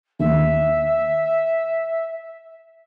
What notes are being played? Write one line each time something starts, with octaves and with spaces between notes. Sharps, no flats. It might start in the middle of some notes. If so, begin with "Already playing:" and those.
D#2 E5